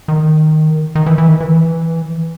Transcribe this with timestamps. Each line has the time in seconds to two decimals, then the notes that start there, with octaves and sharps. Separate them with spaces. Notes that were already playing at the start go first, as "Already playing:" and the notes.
0.08 D#3
0.95 D#3
1.06 E3
1.18 E3
1.28 D#3
1.40 E3